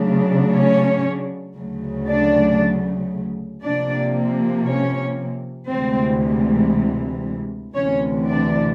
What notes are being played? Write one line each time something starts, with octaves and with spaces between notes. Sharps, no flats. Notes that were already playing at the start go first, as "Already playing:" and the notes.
Already playing: C#3 F#3 A3 D4
C#4 C#5
D2 C#3 F#3 A3
D4 D5
C3 F3 A#3 D4 D5
C#4 C#5
D2 C3 E3 G#3 C4 C5
D2 C3 E3 C#4 C#5
D4 D5